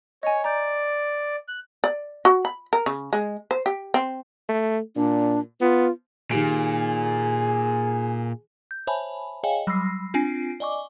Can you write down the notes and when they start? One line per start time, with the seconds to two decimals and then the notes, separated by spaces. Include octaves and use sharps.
0.23 C#5 D#5 G#5
0.44 D5 A#5 G6
1.48 F#6
1.84 D5
2.25 F#4
2.45 B5
2.73 A#4
2.86 C#3
3.13 G#3
3.51 C5
3.66 G4
3.94 C4
4.49 A3
4.96 A#2 D4
5.61 B3 F4
6.31 A#2 D#3 G4 G#4 D7
8.71 G6
8.87 C5 C#5 E5 G#5 A5 B5
9.44 G#4 C#5 D#5 F5 G5 G#5
9.67 F#3 G3 B5 E6 A#6 C7
10.14 C4 D4 F4 G#5 C7 D7
10.60 D5 D#5 G#5 C#6 D6